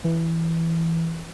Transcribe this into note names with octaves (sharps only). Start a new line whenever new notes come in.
E3